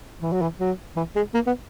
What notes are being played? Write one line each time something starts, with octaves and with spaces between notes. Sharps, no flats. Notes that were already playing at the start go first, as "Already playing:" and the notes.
E3
F#3
E3
F#3
E3
G#3
A#3
B3